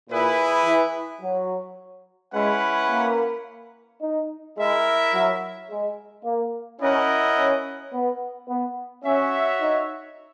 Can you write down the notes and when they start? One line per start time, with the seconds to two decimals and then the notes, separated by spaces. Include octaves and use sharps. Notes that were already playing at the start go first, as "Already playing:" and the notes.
0.10 A#2 E4 G#4 B4
0.66 E3
1.22 F#3
2.34 G#3 C#4 E4 B4 F#5
2.90 A#3
4.02 D#4
4.57 G#3 E4 A#4 E5
5.13 F#3
5.69 G#3
6.25 A#3
6.81 C#4 E4 A#4 D#5 F#5
7.37 C#4
7.93 B3
8.49 B3
9.04 C#4 F#4 C#5 E5
9.61 D#4